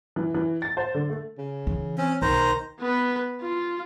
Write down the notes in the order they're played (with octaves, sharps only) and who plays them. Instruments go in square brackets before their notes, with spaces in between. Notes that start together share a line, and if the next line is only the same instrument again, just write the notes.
[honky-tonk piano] E3
E3
A6
C5
D3
A3
[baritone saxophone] C#3
[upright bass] E3
[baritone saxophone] C4 [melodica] C#4
[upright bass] B1 [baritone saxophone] D#3 [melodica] C5 A#5
[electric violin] B3 B4
F4